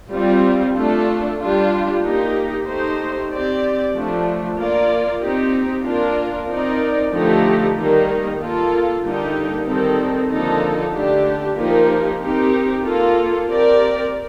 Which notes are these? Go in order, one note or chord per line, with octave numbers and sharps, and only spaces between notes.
G3 C4 F4
A3 D4 F4 A4
G3 D4 F4
A#3 D#4 G4
A3 D#4 G4 C5
C4 G4 D5
F3 A3 D4
A#3 F4 A#4 D5
C4 D#4 G4
A#3 D4 F4 A#4
C4 D#4 A#4 D5
D3 F3 A3 D#4 G4
D#3 G3 A#3 D#4
A#3 F4 A4
D3 G3 A#3 D#4 G4
D#3 G3 C4 D#4 A4
D3 F3 A#3 D#4 A4
D3 A3 D4 G4
F3 A#3 D#4 G4 A#4
C4 D#4 G4 A#4
A#3 F4 A4
C4 G4 A#4 D5